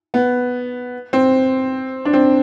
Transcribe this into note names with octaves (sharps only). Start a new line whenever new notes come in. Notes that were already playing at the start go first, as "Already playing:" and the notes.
B3
C4
D4
C4